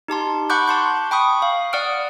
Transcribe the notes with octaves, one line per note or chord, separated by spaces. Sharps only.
D#4 G4 A5 C6
F#5 B5 C#6 D6 F#6 G6
A5 C6 G6
G5 B5 C#6 D#6
F5
D5 F#5 D#6 F6 D7